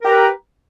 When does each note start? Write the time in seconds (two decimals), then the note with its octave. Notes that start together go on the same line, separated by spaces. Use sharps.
0.02 A#4
0.04 G4
0.07 A#5
0.10 B4